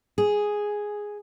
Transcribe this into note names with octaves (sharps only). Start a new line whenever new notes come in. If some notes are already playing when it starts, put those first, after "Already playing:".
G#4